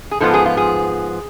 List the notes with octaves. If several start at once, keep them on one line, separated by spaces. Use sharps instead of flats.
G#4
G#2 F3 B3 A4
G#4
F4
G#4